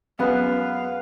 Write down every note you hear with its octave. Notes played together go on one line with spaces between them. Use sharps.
F#2 B3 G#4 B4 F5 F#5